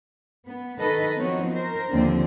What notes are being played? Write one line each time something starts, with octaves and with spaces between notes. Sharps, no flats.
B3
D#3 A4 B4 D#5
F3 B3 C4 D#4 F#4 C#5
A#4 C5
D#2 D3 F3 C4 D4